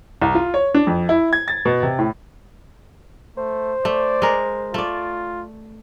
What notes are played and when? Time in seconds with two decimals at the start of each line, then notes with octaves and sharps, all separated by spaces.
0.22 C2
0.35 F4
0.54 C#5
0.74 D4
0.87 F2
1.09 E4
1.33 G#6
1.48 A6
1.65 B2
1.83 C3
1.99 A2
3.37 A3 C5
3.85 A3 D5
4.22 G#3 A#4
4.74 A3 F4 D5